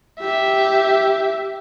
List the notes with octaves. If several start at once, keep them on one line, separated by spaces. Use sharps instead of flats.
G4 E5